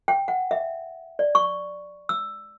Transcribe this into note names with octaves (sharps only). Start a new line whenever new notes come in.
G5
F#5
E5
D5
C#6
E6